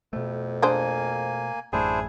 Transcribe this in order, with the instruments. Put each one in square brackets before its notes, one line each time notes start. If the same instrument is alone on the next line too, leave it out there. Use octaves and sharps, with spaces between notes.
[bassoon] F2 [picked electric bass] B2 A3
[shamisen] G#3 D4 C5 [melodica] A#3 G#5
[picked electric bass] A1 F#2 A3 [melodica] D4 E4 C5 [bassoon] G#4